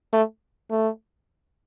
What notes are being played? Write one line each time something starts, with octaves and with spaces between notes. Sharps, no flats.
A3
A3